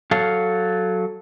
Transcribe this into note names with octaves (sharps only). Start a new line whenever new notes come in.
F#3 A4 F5